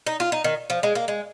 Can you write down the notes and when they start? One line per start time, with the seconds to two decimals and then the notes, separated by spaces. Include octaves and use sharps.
0.07 D#4
0.20 F4
0.32 D#4
0.44 D#3
0.70 F3
0.83 G#3
0.95 A#3
1.08 G#3